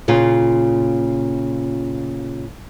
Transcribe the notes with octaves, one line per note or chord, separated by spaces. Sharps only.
A#2 C#3 F4